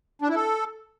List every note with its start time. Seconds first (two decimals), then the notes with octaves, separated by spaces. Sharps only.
0.22 D4
0.29 E4
0.35 A4